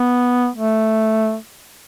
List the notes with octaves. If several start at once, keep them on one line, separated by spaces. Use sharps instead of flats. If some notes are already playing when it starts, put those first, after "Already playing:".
Already playing: B3
A3